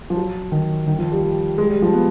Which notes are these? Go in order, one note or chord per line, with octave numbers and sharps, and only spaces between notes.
F3
F#3
D#3
D#3
F3
G3
G#3
G3
F3
B3